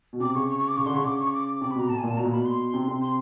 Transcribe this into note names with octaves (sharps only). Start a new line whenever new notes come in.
B2
C3 D6
C#3 C#6
C#6
C#6
D6
C#3 C#6
D3 C6
C#3 C#6
C#3 D6
C#6
D6
C3 D6
B5
B2 A#5
A2 A5
G#5
A#2 A5
B2 A#5
A#2
B2 B5
C6
C3
C3
C6